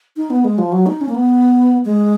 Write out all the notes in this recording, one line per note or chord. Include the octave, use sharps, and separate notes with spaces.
D#4
B3
G#3
F3
F#3
D#4
C#4
A#3
B3
G#3